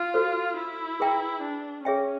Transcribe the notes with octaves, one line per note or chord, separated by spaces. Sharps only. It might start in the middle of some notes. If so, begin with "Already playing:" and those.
Already playing: F4
F#4 A4 C5
E4
G#4 B4 E5 G5 A#5
D4
C#4 G#4 C#5 E5 G5